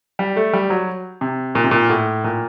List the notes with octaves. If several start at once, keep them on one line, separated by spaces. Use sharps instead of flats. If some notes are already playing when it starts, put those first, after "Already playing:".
G3
A3
G3
F#3
C3
A#2
C3
A#2
A2
A#2